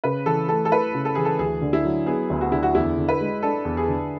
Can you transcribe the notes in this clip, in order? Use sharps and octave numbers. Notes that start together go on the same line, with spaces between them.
C#3 B4
E3 A4
A3 A4
A4
E4 B4
C#3
A4
E3 G#4
A4
D2 G#4
D3
E4
F#3
B3 G#4
D2
F#4
D3 E4
F#4
E2 E4
D3
B4
G#3
D4 A4
E2
G#4
D3